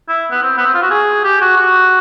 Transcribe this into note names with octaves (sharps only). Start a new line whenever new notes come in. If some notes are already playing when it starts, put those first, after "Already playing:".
E4
B3
C4
B3
C4
F4
F#4
G#4
G4
F#4
F#4